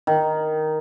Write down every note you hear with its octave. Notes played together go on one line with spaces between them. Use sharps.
D#3